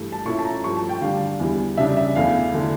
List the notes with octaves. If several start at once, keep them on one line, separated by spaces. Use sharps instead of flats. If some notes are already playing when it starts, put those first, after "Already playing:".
Already playing: G2 E3 A3
A5
A#2 A3 C#4 E4 C#6
A5
A#5
G2 F3 A3 C#6
A5
G5
D3 G3 D4 F5
E2 E3 G3
C#3 G3 D4 E5
E5
E2 E3 A3 E4 F5
D3 A3 E4